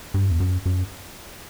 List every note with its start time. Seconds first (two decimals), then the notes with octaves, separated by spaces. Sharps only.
0.14 G2
0.31 E2
0.40 F#2
0.66 F#2